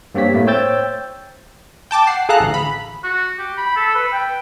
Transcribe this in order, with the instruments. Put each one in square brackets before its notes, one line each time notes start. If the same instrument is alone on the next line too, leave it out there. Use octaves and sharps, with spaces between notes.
[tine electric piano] G2 A#3 C4 G4 C#5 B6
A2 A3 A#3 E4
C5 C#5 G5 E6 G6 A6
[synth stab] G5 A5 D6 A6
F#5 C7
G#4 A4 F5 A#5 F#6
A1 D2
B5
[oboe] F#4
G4
B5
A4
B4
G5